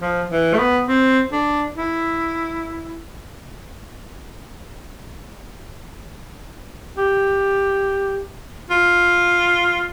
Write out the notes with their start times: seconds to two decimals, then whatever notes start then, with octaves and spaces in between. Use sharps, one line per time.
0.01 F3
0.30 E3
0.53 A3
0.59 B3
0.88 C4
1.32 D4
1.76 E4
6.97 G4
8.70 F4